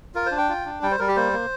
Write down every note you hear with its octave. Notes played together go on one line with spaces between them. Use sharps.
F4 A#4
C5
D4
G5
F4
D4
G3 G5
C5
G3 A#4
G4
A#3 C5
A#3